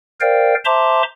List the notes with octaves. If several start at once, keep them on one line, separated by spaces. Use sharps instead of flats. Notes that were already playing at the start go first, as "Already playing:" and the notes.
A#4 C5 D5 F5 G5
C5 E5 A5 A#5 C6 D6